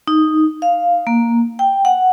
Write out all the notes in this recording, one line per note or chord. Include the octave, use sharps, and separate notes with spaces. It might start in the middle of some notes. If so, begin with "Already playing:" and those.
D#4
F5
A#3
G5
F#5